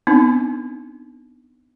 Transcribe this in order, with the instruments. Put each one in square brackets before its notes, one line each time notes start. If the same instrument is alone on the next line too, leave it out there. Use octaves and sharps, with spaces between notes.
[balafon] B3 C4 D4 D#4